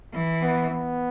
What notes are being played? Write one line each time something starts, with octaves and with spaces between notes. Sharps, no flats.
E3
B3
B3